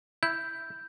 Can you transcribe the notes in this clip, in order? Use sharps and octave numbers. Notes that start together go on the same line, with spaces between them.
E4 G6